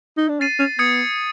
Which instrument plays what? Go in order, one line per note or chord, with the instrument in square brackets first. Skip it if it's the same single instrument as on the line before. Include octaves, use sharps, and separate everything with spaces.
[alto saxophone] D#4
D4
[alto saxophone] C#4 [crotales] A6 C7 D#7
[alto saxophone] C#4
[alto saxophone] B3 [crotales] D#6 G#6 C#7